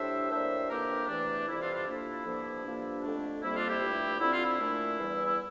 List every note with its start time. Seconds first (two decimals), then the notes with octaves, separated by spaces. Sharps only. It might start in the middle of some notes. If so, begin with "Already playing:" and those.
Already playing: A2 G3 D4 C5 E5
0.30 A2 G3 A#3 D4 C5 E5
0.69 F2 E3 A#3 D4 G4 A#4
1.08 E2 C3 E3 A3 D4
1.47 F2 C3 E3 G3 E4
1.61 D4 F4
1.73 D4 F4
1.87 F2 C3 F3 A#3 D4 E4
2.25 G2 D3 F3 A#3
2.64 G2 F3 A#3 D4
3.03 F2 D3 A3 D4
3.42 F2 C3 G3 A#3 E4
3.56 D4 F4
3.68 E4 G4
3.81 G2 F3 A3
4.20 D3 F3 C4 E4
4.32 F4
4.43 E4
4.60 A#2 A3 D4
4.99 E2 E3 G3
5.26 E4